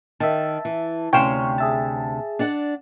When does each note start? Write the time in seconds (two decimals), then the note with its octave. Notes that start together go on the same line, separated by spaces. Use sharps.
0.20 D#3 E5 A5
0.65 E3
1.13 D2 C3 C#4 C#5 F5 G5 C6 E7
1.58 G#4 E5 A5
2.39 D4 D5 F#5